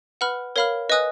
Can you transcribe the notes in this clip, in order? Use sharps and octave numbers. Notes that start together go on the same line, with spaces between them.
B4 F#5 B5 F6
A#4 C#5 F5 B5 F6
B4 D#5 G#5 D#6 F#6